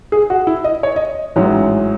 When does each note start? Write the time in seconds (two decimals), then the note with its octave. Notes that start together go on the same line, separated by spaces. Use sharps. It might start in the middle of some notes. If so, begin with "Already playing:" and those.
0.12 G#4
0.30 F#4
0.47 E4
0.64 D#5
0.83 C#5
0.96 D#5
1.36 A1 G#2 F#3 C#4